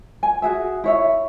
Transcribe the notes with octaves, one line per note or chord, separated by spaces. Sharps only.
G#5
F#4 G#4 E5
E4 C#5 E5